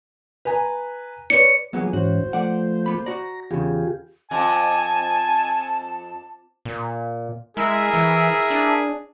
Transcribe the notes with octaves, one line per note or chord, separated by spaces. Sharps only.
B4 G#5 A#5
B4 C#5 D5 C#7
F3 F#3 A#3 B3 G#4
G#2 E3 C#4 F#4 C5
F3 A3 D5 F#5
A#3 B5
F#4 D5 A#5
E2 C#3 F4 G4 G#4
F2 G#5 A5
A#2
G#3 E4 G#4 A#4 E5
E3
D4